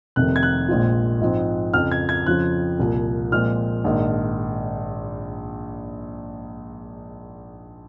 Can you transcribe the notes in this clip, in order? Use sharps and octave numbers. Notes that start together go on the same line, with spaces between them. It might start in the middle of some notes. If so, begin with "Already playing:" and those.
F1 F2 C3 D#3 A#3 F#6
G#6
F#6
A#1 A#2 G#3 C4 F4
G#2 F3 G#3 C4
F2 C#3 F3 F6
G#6
G#6
F2 C#3 F3 C4 F4 F#6
C2 A#2 F3
A#2 F3 G#3 C4 F6
A#1 G#2 D#3